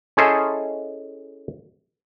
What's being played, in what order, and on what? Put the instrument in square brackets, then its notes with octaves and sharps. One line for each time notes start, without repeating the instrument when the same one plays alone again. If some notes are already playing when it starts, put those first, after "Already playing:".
[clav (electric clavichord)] C#4 E4 G#4 A4 C5 D#5